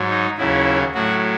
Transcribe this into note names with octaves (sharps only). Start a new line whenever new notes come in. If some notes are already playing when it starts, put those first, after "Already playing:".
Already playing: G#2 F#3
D#4
D#2 C#3 F#3 E4
A2 F#3 F#4